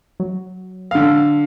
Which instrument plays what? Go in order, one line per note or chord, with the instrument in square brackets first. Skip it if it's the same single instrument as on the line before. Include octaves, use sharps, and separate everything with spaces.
[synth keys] F#3
[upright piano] D3 F5